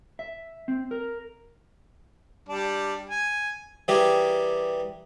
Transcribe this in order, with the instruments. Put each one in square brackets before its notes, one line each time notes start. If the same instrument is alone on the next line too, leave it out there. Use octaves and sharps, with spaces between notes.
[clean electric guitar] E5
C4
A#4
[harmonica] G3 D4
G#5
[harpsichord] E3 G3 G4 G#4 A#4